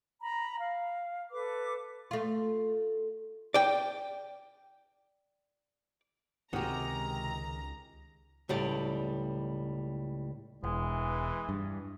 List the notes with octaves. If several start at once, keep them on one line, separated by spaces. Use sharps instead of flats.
A#5 B5
F5
A4 B4 D6
A3 F4
D5 G5
C#2 C3 D#3 G#3 F#4 G4 A#5
C#2 A2 G3 D5
E1 E3 G#3
G2